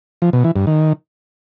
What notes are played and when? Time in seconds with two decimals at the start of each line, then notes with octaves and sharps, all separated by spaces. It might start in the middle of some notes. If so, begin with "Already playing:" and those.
0.22 F3
0.33 B2
0.44 E3
0.56 G2
0.67 D#3